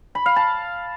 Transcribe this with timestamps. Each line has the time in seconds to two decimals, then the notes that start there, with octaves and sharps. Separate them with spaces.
0.15 B5
0.26 F5
0.36 A5